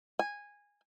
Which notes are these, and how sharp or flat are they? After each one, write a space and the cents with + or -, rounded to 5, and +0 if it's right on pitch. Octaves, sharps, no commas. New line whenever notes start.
G#5 -15